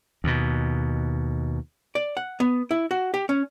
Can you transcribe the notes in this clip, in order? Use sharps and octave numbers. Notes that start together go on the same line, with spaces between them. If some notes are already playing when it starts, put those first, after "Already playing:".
D#2 B2
D5
F#5
B3
E4
F#4
G4
C#4